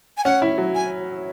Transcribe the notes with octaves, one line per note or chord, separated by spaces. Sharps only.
G#5
C#4 F#5
E4
F#3
G#5